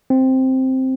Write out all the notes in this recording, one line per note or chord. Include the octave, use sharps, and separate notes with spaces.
C4